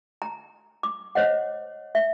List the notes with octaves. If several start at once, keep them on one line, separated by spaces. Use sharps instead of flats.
A#5
D6
C5 C#5 D#5 F#5
E5